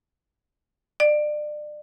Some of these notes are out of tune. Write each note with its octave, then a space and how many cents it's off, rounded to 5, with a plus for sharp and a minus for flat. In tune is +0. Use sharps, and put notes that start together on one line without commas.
D5 +30